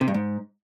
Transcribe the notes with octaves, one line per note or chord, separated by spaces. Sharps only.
C3
G2
G#2